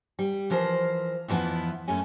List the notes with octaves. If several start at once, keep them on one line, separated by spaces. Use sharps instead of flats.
G3
E3 F3 A#4 C5
F2 E3 F3 B3 E4
F#2 A3 C#4 G#5